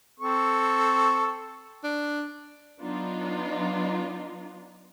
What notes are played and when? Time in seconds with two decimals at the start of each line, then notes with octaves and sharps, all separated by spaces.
0.20 C4 A4 C#6
1.84 D4
2.80 F#3 B3 D4 D#4 F4